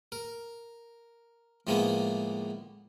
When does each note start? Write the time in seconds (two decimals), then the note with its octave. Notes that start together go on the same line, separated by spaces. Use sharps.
0.12 A#4
1.67 A2 D3 F3 G#3 A#3 B3